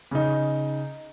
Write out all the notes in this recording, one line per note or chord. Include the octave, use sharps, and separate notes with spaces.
C#3 D#4